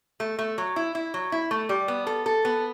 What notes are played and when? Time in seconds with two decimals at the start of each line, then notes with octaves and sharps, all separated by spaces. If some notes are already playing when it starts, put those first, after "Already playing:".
0.20 A3
0.39 A3
0.58 F#3
0.76 E4
0.95 E4
1.14 F#3
1.32 E4
1.51 A3
1.69 G3
1.88 B3
2.07 A4
2.26 A4
2.45 B3